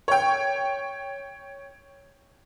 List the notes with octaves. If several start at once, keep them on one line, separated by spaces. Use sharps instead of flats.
C#5 G5